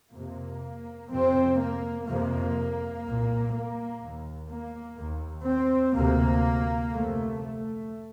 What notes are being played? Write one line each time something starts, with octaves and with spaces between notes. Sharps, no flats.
F2 C3 A#3
F2 C3 C4
A#3
F2 C3 A#3
C2 A#2
A#3
D#2
A#3
D#2
C4
D2 C3 A#3
F2 C3 A3
A3